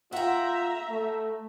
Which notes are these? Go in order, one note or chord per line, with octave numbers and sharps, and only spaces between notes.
F4 E5 F#5 G5 A#5
A3